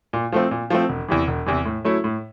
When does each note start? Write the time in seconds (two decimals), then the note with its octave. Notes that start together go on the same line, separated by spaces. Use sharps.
0.13 A#2
0.32 F3 A3 C4
0.51 A#2
0.70 F3 A3 C4
0.89 E1
1.08 E2 C3 E3
1.27 E1
1.46 E2 C3 E3
1.65 A2
1.85 F#3 A3 C#4 E4
2.04 A2